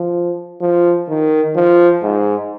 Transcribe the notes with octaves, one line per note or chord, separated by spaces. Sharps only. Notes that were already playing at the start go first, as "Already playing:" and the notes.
Already playing: F3
F3
D#3
F3
G#2